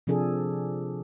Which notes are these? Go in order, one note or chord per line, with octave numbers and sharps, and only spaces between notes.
C3 F3 D4 G#4 A4